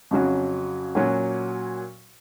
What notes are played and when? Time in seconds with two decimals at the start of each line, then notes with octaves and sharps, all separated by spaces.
0.11 F2 C#3 F#3 C#4 F#4
0.95 A#2 F#3 C#4 F#4